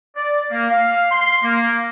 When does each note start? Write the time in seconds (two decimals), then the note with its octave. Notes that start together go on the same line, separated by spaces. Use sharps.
0.16 D5
0.50 A#3
0.69 F5
1.11 C6
1.44 A#3